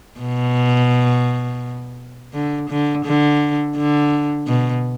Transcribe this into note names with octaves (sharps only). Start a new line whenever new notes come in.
B2
D3
D3
D3
D3
B2